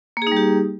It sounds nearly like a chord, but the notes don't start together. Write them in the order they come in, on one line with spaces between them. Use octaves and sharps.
A#3 G#4 D#4 G3 G4